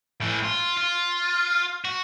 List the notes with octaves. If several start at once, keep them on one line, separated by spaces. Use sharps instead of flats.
A2 E3
F4
F4
F#4